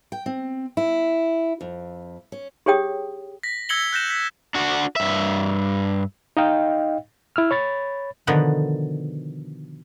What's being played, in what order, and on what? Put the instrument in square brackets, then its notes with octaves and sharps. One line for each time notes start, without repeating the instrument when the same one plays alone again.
[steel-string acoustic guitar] G5
C4
E4
F2
C#4
[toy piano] G4 G#4 C#5 G5 D#6
[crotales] A#6 B6
E6 G#6 A#6 C#7 F#7 G7
F#6 G6 A#6 E7
B6
[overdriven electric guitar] D4 F#4
G2 E5
[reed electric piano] D#4 D#5 F5 G5
E4 E6 F6
C#5 B5 A6
[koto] B2 D3 D#3 F3 B3